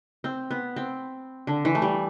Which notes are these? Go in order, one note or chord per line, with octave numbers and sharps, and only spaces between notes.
C4
B3
C4
D3
E3
A3
G3